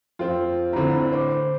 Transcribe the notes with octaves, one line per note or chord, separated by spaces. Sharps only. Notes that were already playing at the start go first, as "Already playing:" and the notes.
F2 C4 F4
A2 D3 C4 A#5
C5 D6